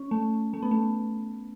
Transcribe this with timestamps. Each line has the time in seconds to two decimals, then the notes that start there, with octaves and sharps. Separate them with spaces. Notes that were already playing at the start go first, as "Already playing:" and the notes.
Already playing: C#4
0.11 A3
0.53 A3
0.62 B3
0.71 A3